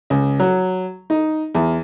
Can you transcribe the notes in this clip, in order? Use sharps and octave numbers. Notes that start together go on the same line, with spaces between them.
C#2
F#3
D#4
E2